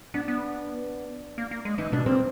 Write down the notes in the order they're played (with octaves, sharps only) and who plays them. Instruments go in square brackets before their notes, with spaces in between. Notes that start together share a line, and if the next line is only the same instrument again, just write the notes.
[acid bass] B3 [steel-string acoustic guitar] D4
[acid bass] B3
A#3
A#3
G#3
[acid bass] E3 [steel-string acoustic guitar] D#4
[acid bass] B2 [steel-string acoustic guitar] D4
[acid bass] A#2 [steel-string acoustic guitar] C4